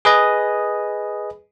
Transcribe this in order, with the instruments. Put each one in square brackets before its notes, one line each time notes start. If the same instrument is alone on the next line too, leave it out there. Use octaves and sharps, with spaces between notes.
[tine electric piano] G#4 B4 D#5